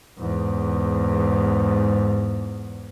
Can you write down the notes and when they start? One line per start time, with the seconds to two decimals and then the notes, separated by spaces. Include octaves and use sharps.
0.18 E2 G#2